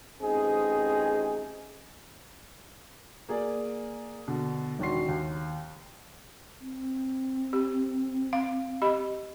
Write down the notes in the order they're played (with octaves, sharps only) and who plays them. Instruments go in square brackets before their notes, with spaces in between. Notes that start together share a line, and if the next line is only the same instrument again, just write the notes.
[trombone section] A1 C4 D#4 G#4
[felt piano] A#3 G#4 D5
B2 D3
E1 D#3 D4 F#4 C6 C7
D#2
[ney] C4
[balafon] G4
F5
G4 D#5 B5